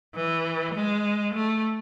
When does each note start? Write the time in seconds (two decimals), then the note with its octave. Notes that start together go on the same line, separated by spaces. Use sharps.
0.15 E3
0.74 G#3
1.34 A3